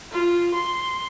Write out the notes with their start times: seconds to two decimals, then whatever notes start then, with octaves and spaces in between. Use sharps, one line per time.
0.11 F4
0.54 C6